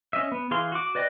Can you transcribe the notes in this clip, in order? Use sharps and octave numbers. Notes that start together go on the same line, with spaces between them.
C#4 D#5 E5
B3
E3 G#4 F5 C6
F#4 D6
B4 D5 D#5 G5